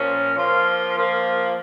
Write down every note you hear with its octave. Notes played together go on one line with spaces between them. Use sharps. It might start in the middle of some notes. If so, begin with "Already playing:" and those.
Already playing: A#2 F3 C#4
F3 A#3 F4
F3 A#3 F4